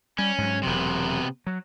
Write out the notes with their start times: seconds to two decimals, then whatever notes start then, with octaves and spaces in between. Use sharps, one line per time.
0.18 G3 C#4
0.38 G#2 F#3
0.63 E1 C3 F#3 B3
1.47 F#3